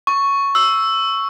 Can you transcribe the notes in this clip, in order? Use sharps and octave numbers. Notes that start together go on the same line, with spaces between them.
C#6
E6